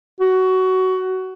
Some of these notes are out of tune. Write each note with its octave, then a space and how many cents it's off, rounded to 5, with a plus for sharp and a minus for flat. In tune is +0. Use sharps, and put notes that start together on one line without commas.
F#4 +20